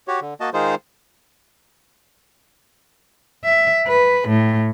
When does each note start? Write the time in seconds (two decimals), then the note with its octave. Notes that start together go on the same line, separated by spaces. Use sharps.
0.08 F#4 G4 C#5
0.21 D3
0.40 A#3 F#4 D#5 A5
0.54 D#3 G#3 D#4 F4 G#4 C5
3.45 E5
3.87 B4
4.29 A2